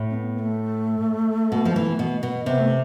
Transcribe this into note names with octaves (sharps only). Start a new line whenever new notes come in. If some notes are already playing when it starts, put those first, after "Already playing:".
Already playing: A2
C4
B3
B3
A3
B2
F3
E3
B2
B2
C3 B3
A3